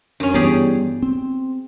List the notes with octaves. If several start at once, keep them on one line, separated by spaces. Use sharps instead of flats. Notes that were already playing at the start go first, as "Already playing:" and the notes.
F#2 C#4 D4
G2 E3 B3 G4 G#4 D5
C4